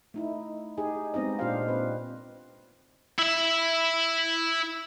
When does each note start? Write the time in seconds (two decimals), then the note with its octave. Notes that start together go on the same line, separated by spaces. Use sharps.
0.14 A3 D#4 E4
0.78 D#4 G4 G#4
1.14 G#3 B3 C4 D#4 D#5
1.39 A#2 D4 F4 G4 C5 F5
1.68 C4 B4
3.19 E4 E5